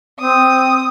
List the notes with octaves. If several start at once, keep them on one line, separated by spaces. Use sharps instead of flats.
C4 D#6